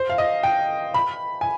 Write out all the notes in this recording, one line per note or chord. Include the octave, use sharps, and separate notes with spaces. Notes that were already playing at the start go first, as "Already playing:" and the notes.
Already playing: C5
F5
D#5
G5
B5
G#5